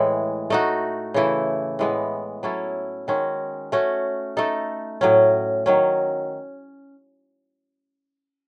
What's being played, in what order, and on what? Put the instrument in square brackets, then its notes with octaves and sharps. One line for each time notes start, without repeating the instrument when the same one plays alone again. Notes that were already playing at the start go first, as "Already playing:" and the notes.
Already playing: [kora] A2 E3 G#3
A3 D#4 F#4
C#3 E3 A3 E4
A2 E3 G#3 B3
F#3 C#4 E4 A4
D#3 G#3 C#4 F#4
A3 C#4 F#4
A3 D#4 A4
A2 F#3 C#4
D#3 F#3 C#4